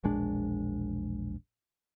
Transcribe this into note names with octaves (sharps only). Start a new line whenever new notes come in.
E1 A#1 G#3 D4